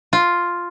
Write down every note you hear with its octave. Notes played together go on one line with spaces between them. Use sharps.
F4